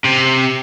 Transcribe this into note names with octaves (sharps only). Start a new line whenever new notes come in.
C3